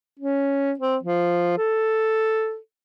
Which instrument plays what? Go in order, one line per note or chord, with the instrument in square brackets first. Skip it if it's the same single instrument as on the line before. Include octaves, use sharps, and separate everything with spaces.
[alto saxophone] C#4
C4
F3
A4